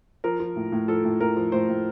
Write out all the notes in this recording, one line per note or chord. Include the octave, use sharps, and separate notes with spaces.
F3 A#4
F3
A2
A2
F3 A4
A2
A2 A#4
F3
A2 C5
A2